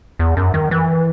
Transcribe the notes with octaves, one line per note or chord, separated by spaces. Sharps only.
E2
F#2
D#3
E3